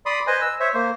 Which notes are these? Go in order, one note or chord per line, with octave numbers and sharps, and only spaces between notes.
D5 B5 C6 D#6
B4 C5 D#5 G#5
E6
C5 C#5 E5
A#3 C5